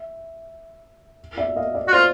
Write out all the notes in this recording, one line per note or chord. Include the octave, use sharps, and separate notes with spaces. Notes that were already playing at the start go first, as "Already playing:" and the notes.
Already playing: E5
D5 E5
D#5 F5
D5 E5
F#4
F4 C5 D5